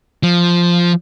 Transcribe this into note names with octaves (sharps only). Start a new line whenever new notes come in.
F3